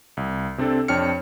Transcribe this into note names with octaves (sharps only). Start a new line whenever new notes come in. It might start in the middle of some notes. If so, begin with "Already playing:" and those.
C2
C3 C4 D4 A4
F2 D4 C#5 G5 F6 C#7